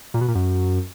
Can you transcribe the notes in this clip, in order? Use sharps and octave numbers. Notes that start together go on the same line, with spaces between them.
A#2
B2
A#2
F#2